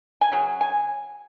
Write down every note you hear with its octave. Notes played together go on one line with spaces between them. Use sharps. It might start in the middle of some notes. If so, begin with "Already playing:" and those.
G#5
C#3 F#3
G#5